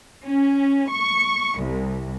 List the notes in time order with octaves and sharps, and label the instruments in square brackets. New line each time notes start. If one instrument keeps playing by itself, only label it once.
[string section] C#4
C#6
C2